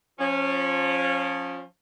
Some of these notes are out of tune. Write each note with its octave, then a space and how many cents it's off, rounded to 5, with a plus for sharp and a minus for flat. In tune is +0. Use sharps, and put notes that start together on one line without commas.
F3 +20 C#4 -15